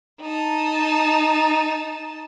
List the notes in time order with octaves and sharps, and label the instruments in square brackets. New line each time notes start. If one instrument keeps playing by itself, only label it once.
[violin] D#4 A5